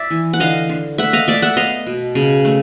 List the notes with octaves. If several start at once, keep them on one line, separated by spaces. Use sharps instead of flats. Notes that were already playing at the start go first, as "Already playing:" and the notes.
Already playing: D5 E5
E3
F#5
D3 D#5 F5
D3
A3 E5 F#5
D#5 F5
A3 D5 E5
E5 F#5
B3 D#5 F5
B2
C#3
A3